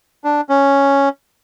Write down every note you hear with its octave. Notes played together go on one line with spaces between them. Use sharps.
D4
C#4